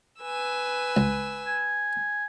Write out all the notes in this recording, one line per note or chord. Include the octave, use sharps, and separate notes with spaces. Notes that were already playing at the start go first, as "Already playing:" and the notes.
B4 G#5 E6
C#2
G#5